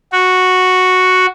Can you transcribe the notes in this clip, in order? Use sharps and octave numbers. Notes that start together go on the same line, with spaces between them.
F#4